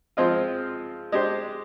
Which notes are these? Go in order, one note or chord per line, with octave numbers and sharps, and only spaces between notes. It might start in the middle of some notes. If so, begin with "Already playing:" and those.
F3 G#3 C4 F4
G#3 D4 G4 C5